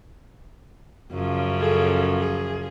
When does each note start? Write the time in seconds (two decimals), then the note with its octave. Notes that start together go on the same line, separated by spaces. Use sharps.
1.13 F#2 C#3 F3
1.60 G#4 A4
2.20 G#4